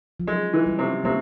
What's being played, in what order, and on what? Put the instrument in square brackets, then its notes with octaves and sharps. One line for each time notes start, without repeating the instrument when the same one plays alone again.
[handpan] F3
[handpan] F#3 [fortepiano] G#3
[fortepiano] E3
[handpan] G3
[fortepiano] C3
[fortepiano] C3 [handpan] G#3 A#3